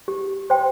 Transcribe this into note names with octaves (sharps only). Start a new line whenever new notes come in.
G4
C5 G5 C6